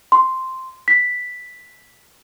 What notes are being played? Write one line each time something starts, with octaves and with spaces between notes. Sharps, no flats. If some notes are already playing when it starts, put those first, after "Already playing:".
C6
B6